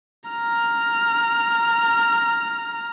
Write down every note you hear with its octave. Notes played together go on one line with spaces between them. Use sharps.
A#5 F6